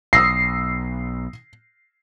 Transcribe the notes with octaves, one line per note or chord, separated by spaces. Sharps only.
B1 D#6 E6 A#6 C7